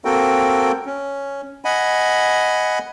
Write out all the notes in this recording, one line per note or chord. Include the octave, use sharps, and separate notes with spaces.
A#3 C4 F#4 A4 A#4 G5
C#4
D#5 F#5 G#5 B5